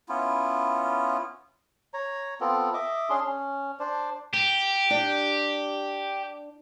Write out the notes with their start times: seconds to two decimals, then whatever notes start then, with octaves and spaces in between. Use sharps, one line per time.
0.09 B3 C#4 E4 F4
1.94 C#5 A#5
2.41 B3 C4 F4 A4
2.74 D#5 E5 D6
3.10 C#4 D4 G#4 C6
3.24 C#4
3.80 D4 C5 D5
4.33 G4 A#5
4.91 D4